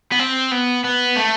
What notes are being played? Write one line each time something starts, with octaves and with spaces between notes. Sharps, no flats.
B3
C4
B3
B3
A3